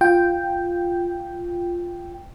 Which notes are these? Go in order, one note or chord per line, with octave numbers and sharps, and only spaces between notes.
F4 G5